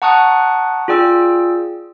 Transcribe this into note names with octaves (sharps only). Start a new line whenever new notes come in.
F#5 A5 A#5 C#6 D#6 F#6
F4 G#4 D5 G5 E6